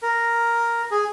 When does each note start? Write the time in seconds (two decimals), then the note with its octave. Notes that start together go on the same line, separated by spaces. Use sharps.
0.02 A#4
0.91 G#4